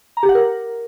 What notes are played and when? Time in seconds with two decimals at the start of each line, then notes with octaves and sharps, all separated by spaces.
0.17 A#5
0.23 G4
0.29 F#5
0.35 A#4